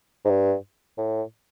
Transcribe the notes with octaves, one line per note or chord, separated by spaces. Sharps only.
G#2
G2
A2